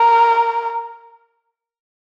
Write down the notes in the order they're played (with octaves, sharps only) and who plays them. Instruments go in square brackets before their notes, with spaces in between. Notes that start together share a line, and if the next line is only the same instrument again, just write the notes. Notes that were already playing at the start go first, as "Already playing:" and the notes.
Already playing: [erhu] A#4